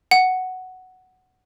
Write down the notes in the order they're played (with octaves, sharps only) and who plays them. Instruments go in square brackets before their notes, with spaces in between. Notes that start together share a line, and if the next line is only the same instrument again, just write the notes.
[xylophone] F#5